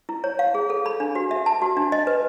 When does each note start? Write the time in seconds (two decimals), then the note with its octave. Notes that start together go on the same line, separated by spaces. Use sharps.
0.09 E4
0.24 C#5
0.39 F5
0.55 G#4
0.70 A4
0.86 B5
1.00 D4
1.15 F#4
1.31 E5
1.46 A5
1.62 F#4
1.77 D4
1.92 D#5
2.07 B4